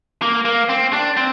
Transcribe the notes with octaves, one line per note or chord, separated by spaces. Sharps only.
A#3
A#3
C4
D4
C4